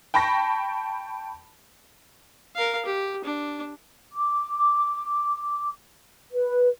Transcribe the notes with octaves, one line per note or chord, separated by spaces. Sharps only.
G5 A5 B5 C#6 A#6
A#4 F5
G4
D4
D6
B4